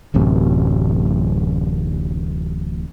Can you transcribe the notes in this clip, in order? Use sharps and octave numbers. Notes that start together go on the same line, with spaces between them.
D1 A1 F#2 C3